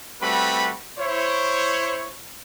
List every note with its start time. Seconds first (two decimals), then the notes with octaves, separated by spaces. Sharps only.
0.22 G3 A3 C4 F#4 B4 B5
0.99 E4 C5 C#5